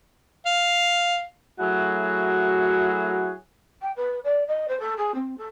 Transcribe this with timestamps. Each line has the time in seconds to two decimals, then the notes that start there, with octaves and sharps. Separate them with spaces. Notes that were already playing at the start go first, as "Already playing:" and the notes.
0.46 F5
1.59 F#3 A3 E4 F#4 G#4 C#5
3.81 G5
3.96 B4
4.24 D5
4.47 D#5
4.68 C5
4.79 A4
4.97 G#4
5.14 C4
5.37 A4